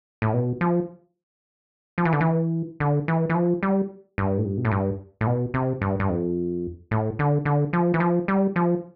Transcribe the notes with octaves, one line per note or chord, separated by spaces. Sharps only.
A2
B2
F3
F3
E3
D3
E3
D3
E3
E3
F3
G3
G2
A2
G2
B2
A2
G2
A2
B2
C3
G2
G2
F2
A2
D3
D3
F3
E3
F3
G3
F3